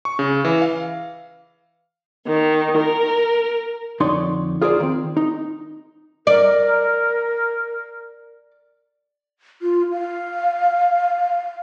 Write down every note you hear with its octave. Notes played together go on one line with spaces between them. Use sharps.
C#6
C#3
E3
F5
D#3
A#4
F2 D3 D#4 C#5 D5 C6
F4 G#4 A#4 C5 D5
D#3 C4
D#4
A#4 D5
F4
F5